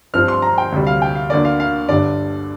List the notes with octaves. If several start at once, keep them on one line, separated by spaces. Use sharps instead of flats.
G2 F3 C4 F6
C6
A#5
G5
D2 C3 G3
F5
G5
F5
D2 D3 A#3 D5
F5
F5
G1 G2 D3 D5